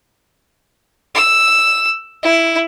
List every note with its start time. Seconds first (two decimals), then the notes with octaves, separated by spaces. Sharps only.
1.15 E6
2.23 E4